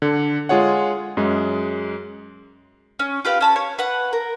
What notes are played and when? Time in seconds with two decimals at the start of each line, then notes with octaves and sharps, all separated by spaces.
0.02 D3
0.49 G#3 F4 G#4 C#5 F#5
1.17 F#2 G#3
2.99 C#4
3.25 F4 G4 B4 F5
3.41 C#4 A5 B5
3.56 C#5
3.79 B4 F#5
4.13 A#4